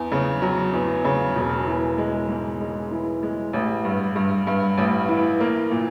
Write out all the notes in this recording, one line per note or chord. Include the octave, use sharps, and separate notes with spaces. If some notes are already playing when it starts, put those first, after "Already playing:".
Already playing: E2
C#3
F#3
E2
C#3
E1
E3
G#3
G#2
G#3
E3
G#3
A1
G2
G2
G2
A1
E3
A#3
A#2